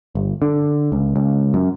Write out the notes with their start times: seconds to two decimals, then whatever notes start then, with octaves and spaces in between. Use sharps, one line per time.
0.15 G1
0.42 D3
0.92 C#2
1.16 C#2
1.54 F#2